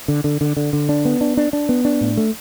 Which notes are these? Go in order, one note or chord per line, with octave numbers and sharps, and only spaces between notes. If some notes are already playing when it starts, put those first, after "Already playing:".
D3
D3
D3
D3
D3
D4
B3
D4
D4
D4
B3
D4
A2
A3